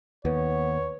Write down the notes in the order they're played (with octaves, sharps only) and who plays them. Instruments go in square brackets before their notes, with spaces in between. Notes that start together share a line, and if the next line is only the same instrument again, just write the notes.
[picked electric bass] D#2 [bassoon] B3 [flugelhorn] C#5